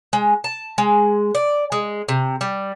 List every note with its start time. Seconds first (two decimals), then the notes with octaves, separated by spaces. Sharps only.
0.13 G#3
0.44 A5
0.78 G#3
1.35 D5
1.72 G#3
2.09 C3
2.41 G3